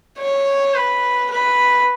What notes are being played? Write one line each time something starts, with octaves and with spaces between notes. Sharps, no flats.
C#5
B4
B4